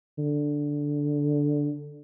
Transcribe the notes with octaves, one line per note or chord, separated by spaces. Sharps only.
D3